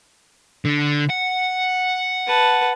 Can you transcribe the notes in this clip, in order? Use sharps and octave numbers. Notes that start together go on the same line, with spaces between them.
D3
F#5
B4 A5